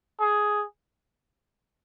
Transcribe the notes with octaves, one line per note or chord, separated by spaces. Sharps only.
G#4